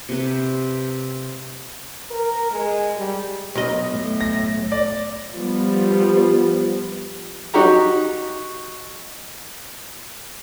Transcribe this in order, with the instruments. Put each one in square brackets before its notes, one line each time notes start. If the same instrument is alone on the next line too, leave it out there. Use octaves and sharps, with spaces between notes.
[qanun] C3 B4
[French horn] A#4
G#3
G3
[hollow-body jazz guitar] B1 D#5
[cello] A2
[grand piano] A#6
D5
[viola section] F3 G3 B3
[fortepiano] D#4 F#4 G4 A#5